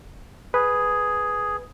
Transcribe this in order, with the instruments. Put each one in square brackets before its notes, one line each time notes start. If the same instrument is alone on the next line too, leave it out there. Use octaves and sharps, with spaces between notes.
[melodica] G#4 [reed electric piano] B4